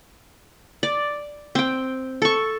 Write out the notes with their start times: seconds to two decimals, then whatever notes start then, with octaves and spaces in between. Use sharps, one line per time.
0.83 D5
1.55 C4 G5
2.22 A4 C#6